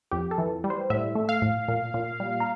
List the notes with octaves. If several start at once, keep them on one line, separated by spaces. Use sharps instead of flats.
F2 G4
A4
E3
G3
C5
A2 E5
A3
F5
A2
A#2
A#2
G3
A#5